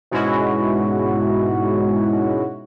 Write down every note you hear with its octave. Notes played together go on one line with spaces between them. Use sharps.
G#2 B2 G#3 C#4 E4 F#4